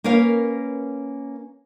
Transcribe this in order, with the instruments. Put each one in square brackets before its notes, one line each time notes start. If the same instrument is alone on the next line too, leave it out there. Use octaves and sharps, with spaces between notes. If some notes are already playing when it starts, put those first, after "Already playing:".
[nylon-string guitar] A#3 C#4 A#4 B4 C#5 F5